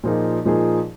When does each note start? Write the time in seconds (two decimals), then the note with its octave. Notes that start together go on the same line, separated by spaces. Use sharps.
0.04 A#2 F3 A#3 D#4 G#4
0.45 A#2 F3 A#3 D#4 G#4